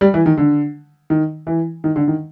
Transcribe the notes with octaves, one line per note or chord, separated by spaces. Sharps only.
G3
E3
D#3
D3
D#3
E3
D#3
D3
D#3